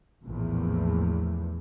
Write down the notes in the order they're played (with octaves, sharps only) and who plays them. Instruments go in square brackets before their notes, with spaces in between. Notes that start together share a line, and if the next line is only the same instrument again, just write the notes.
[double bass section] A#1 E2 A2